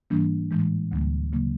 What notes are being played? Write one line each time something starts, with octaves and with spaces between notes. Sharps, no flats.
G#2 E3 G3 A#3 D4
A2 E3 G#3
D2 D3 G3 A#3
C#3 F#3 A#3